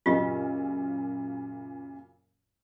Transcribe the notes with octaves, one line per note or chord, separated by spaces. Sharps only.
F#2 A#2 C#3 F4 G4 D#5